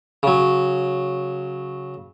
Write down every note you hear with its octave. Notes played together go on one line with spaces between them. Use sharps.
C#3 F#3